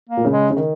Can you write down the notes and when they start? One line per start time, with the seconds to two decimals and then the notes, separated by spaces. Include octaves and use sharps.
0.09 A#3
0.17 A#2
0.25 C#3
0.33 G#3
0.50 C#3
0.57 D#3